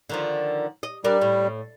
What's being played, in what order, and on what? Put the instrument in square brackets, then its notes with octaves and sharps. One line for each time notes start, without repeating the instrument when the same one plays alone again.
[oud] D3 D#3 F3
D#5
[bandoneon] G3 [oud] D4 A#4
[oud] A2